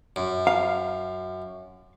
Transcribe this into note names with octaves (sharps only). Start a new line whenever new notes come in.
F#2
F5